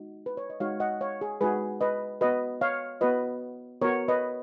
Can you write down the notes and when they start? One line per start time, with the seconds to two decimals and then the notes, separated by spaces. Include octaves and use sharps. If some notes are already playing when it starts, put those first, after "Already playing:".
Already playing: G#3 D#4 F#4
0.26 B4
0.37 C#5
0.50 D#5
0.60 G#3 D#4 F#4 C#5 F5
0.80 D#5 F#5
1.01 C#5 F5
1.21 G#4
1.41 G#3 D#4 F#4 G#4 B4
1.81 B4 D#5
2.21 B3 F#4 B4 D#5
2.61 C#5 F5
3.01 B3 F#4 B4 D#5
3.82 B3 F#4 A#4 C#5
4.08 B4 D#5